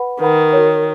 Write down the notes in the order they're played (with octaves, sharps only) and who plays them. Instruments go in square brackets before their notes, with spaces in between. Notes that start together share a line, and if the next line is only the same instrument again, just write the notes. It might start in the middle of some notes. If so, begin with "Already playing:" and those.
Already playing: [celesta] B4 F#5 B5
[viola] D#3 [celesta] B4 F#5 B5
[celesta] F#4 A#4 C#5